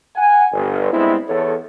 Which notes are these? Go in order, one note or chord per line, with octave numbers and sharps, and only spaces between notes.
F#5 G#5
G1
G2 G#3 B3 C4 E4
E2 A4 C#5